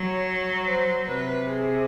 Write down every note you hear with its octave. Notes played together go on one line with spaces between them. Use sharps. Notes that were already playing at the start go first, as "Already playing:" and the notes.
Already playing: F#3 C#5
C5
C3 B4
G#4